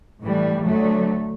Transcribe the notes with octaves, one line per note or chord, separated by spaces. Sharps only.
A2 E3 G3
D2 D3 F#3 A3